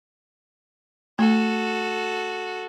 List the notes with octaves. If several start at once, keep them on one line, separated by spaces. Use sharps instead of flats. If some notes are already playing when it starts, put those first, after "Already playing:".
A3 F#4 A4